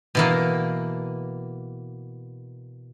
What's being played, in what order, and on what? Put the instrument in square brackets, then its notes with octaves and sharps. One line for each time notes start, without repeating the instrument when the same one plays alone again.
[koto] B2 E3 A#3